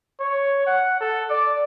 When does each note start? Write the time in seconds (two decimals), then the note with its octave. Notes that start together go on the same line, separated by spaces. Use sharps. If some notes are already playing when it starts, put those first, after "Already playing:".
0.20 C#5
0.67 F#5
1.01 A4
1.30 D5